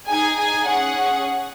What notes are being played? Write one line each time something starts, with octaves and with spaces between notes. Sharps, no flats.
D#4 G#4 G#5
G#5
C#4 G#4 F#5